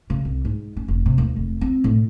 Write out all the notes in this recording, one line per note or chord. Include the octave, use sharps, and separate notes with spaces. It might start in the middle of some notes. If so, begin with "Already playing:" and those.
C#3
C2
G#2
C#4
F1
C3
D#2
F1
C4
A2